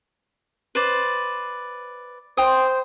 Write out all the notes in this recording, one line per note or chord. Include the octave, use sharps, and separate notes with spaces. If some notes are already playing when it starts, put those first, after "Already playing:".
B4 C5 D5
C5 G5 D#6